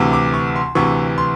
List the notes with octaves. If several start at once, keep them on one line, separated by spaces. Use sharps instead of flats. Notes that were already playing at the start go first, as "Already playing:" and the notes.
Already playing: D2 C3 E3
D6
C#6
C6
D2 C3 E3 C#6
C6